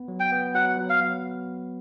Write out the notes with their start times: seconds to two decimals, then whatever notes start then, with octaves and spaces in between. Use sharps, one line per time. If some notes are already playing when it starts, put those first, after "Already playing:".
Already playing: B3
0.08 F#3
0.20 G5
0.32 B3
0.55 F#3 F#5
0.77 F#3
0.90 F5
1.01 F#3